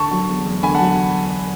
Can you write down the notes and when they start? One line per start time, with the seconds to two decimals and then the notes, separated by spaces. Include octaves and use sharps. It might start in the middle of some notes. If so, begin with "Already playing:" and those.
Already playing: D3 A5 C#6
0.11 F#3
0.29 E2
0.46 E2
0.63 D3 G#5 B5
0.74 F#5 A5
0.80 F#3